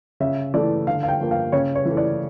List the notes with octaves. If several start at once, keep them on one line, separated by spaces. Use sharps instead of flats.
C#3 E5
E3 A3 D5
D3 F5
F5
G5
F3 A#3
F5
C#3 C#5
C#5
E3 A3
D5